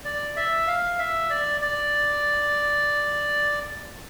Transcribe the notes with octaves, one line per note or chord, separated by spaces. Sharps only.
D5
E5
F5
E5
D5
D5